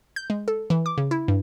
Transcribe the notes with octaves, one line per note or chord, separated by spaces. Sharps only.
G6
G#3
A4
E3
D6
C#3
E4
G2